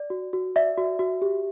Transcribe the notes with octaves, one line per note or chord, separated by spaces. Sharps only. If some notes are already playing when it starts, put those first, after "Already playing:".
Already playing: D5
F#4
F#4
D5 E5
F#4
F#4
G4